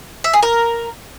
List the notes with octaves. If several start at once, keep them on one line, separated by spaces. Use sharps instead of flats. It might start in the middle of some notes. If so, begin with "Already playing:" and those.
E5
G#4
A#4